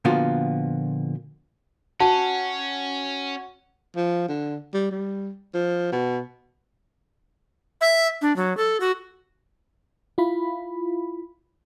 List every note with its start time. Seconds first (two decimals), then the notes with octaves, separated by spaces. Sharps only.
0.05 A#2 D3 F3 B3 F4 F#4
2.00 C#4 F#4 F#5 A5
3.96 F3
4.28 D3
4.74 G3
4.91 G3
5.54 F3
5.92 B2
7.81 E5
8.22 D4
8.36 F#3
8.57 A4
8.80 F#4
10.18 E4 F4 B5